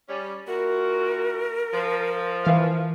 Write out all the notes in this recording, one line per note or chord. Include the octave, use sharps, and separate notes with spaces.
G3 C#4
A#2 E4 F#4 A#4
F3
E3 F5